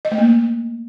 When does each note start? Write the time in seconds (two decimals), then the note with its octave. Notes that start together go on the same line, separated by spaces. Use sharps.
0.05 D#5
0.11 A3
0.18 A#3